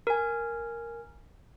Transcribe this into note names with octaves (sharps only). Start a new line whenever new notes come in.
A#4 G#5